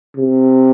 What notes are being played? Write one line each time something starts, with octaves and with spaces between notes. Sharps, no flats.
C3